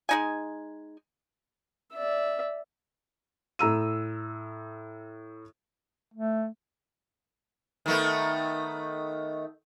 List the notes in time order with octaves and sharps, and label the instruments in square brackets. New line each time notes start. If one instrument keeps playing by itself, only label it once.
[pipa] G#3 D#4 G#5
[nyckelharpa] D5 E5
[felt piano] A2 A#5 E6 D#7
[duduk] A3
[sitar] D#3 A3 B3